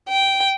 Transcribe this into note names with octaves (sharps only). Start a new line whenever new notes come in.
G5